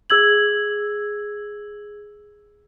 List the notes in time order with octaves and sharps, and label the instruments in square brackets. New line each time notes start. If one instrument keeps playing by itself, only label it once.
[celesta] G#4 E6 G#6 F#7